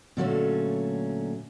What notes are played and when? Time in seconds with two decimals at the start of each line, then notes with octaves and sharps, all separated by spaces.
0.17 A#2 D3 F#3 G3 A3 C#4